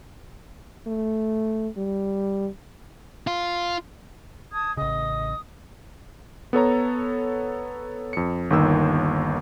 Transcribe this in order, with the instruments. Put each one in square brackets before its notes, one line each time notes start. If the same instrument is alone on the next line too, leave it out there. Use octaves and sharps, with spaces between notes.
[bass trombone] A3
G3
[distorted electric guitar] F4
[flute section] A5 D#6 G#6
[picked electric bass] A1 C#3 [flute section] D#5 [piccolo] D#6
[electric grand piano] B3 A4 C#5 A#5
F2 C#7
G1 D#2 D#3 E6